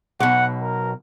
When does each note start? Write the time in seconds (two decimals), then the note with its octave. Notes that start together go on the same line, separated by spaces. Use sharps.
0.20 B1 B2 F#5
0.61 A#4